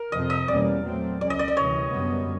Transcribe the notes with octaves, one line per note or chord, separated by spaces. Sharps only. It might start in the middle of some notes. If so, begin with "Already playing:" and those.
Already playing: A#4
F2 C3 F3 D#5
D#5
E2 B2 G3 A#3 C#4 D5
A#2 F#3 A3 C4
C#2 B2 G#3 C#4 D5
D#5
D5
D#5
D2 C3 E3 G3 C#5
F#2 D3 G3 B3